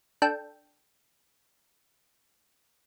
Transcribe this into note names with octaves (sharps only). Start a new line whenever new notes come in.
D4 A4 G5